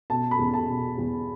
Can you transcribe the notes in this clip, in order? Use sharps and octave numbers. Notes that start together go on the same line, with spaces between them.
B2 A5
B5
E2
A5
B2
E2